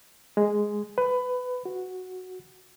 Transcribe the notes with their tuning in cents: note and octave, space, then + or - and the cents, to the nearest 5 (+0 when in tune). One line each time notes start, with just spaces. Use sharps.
G#3 +0
B4 +20
F#4 -5